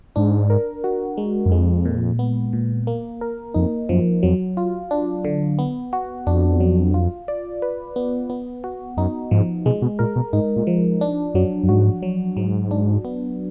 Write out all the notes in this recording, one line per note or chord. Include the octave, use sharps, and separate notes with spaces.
G#2 D4
A#4
F#4
G#3
F#2
F2 G#3
A#2
B3
A#2
A#3
A#4
F2 D#4
F#2 F3
F2 F#3
F4
D4
D3
B3
F#4
F2 D4
F#3
F4
D5
B4
B3
B3
F#4
F#2 D#4
G#2 F3
B2 G#3
B2
A#2 A#4
B2
G#2 D#4
A#2
F3
D4
F#2 F#3
F#2
G#2 F#4
F#3
G#2 F#3
D4
B3